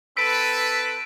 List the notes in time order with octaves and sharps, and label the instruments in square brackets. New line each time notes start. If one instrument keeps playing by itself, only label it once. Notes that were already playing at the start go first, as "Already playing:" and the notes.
[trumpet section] C4 A4 B4 [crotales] E6 B6 D7